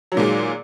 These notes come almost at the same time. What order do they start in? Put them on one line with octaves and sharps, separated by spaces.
F#3 D#3 A#2 G#3